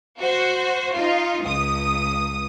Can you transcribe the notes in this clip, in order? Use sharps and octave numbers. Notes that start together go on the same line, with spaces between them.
F#4 C5
D#4 F4
C#2 D#6